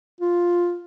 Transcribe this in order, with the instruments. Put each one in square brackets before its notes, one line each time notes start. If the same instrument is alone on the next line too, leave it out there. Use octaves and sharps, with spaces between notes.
[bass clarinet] F4